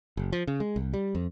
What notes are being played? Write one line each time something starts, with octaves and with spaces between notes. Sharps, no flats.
F#1
F3
C#3
G#3
C2
G3
F2